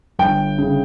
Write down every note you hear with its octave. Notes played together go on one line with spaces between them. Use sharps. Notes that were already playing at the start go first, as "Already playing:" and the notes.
G1 G5
C#3